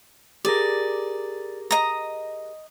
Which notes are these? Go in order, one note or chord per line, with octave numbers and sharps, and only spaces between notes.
G4 G#4 A#4 D5
D#5 A#5